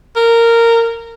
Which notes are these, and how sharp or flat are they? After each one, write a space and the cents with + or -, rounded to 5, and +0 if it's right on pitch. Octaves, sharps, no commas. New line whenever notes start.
A#4 -15